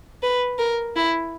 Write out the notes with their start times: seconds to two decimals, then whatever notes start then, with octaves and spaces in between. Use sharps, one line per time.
0.23 B4
0.58 A#4
0.96 E4